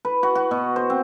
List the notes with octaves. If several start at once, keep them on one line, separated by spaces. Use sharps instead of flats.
B4
F#4
F#4
B2
C5
C4